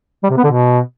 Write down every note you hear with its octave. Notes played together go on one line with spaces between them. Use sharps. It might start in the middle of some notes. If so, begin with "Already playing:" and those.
G3
C3
B3
D3
B2